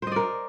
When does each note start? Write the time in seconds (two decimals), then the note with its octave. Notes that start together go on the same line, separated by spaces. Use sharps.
0.02 C5
0.07 D#5
0.12 D5
0.16 A#4